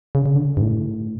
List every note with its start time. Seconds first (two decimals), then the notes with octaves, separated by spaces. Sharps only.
0.15 C#3
0.26 C#3
0.36 D3
0.57 G2
0.61 A2